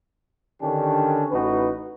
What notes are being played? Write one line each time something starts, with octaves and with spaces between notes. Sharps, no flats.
D3 D#3 C#4 D4 G4
A1 D#4 F#4 B4